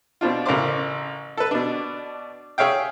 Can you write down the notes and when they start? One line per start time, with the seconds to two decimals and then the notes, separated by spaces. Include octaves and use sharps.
0.21 B2 C4 D4 F4
0.46 A1 C#3 A#4 C5 C6 D6
1.37 A4 B4
1.51 B2 D4
2.58 G#4 C#5 E5 F5 G5